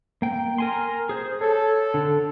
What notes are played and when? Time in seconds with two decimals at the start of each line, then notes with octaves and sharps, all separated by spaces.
0.22 A#3 G5
0.58 A#4 G#5 C6
1.09 G#4 C5
1.41 A4 C#5
1.94 D3